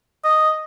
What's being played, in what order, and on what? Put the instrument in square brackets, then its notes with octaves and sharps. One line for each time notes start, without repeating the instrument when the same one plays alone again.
[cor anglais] D#5